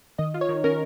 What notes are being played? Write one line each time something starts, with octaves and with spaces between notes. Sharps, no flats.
D#3 D#5
F4
C#5
D#3
C#4 A#4